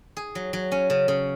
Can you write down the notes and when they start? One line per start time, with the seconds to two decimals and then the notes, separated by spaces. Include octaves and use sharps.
0.17 G#4
0.35 F#3
0.53 F#3
0.72 C#4
0.90 C#3
1.08 C#3